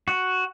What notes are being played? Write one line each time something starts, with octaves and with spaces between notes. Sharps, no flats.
F#4